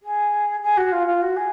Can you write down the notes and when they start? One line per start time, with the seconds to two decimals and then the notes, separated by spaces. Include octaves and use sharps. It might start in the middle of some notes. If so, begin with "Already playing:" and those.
0.02 G#4
0.62 G#4
0.77 F#4
0.91 F4
1.06 F4
1.21 F#4
1.36 G#4